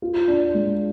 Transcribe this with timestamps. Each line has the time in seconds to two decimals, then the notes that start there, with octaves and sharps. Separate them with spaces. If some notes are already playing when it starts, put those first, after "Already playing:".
0.02 F4
0.28 D4
0.54 G#3